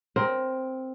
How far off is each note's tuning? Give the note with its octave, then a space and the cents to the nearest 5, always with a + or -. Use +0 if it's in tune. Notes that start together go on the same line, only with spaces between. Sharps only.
C4 +0 A#4 +15